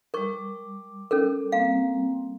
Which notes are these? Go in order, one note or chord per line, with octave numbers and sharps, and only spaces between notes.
G3 A#4 C#6 D6
C#4 A4 A#4
G3 A#3 C4 F5